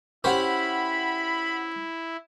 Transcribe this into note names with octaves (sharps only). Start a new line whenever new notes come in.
C#4 E4 G4 C5 F#5 B5